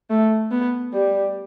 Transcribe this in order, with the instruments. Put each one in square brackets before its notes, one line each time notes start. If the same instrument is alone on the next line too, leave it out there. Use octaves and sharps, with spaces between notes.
[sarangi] A3
B3
G3